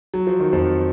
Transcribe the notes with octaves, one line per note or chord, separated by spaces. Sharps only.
F#3
F3
D#3
F2 F3